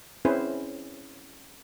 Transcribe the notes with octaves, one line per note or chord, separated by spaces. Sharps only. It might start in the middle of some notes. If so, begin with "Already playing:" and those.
C4 C#4 E4 G#4 B4 C5